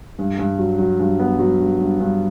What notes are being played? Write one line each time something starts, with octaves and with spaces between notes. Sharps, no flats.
G2
G2
F#3
F#3
G2
B3
F#3
G2
G2
G2